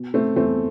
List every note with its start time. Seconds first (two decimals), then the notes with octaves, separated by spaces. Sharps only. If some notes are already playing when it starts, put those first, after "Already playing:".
Already playing: B2
0.14 A3 C4
0.36 E2 A3 C4